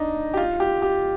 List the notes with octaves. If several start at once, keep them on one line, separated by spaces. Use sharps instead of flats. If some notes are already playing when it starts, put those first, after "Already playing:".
Already playing: D4 D#4
G4
F4
G4
G4